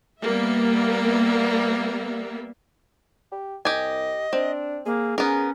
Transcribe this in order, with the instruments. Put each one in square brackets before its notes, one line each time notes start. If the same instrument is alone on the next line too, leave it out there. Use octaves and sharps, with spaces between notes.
[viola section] G3 A#3 B3 E5
[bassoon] G4
[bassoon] C2 [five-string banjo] G4 G#5 [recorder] D#5
[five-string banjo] C4 [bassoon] D4
[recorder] A#3 [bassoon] G#4
[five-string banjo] B3 A#4 [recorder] C#4 [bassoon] G#4